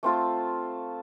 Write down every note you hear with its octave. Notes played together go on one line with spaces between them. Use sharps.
A3 C4 F4 A4